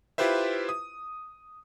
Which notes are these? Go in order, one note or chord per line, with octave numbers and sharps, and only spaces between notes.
E4 F4 G4 B4 C5 E5
D#6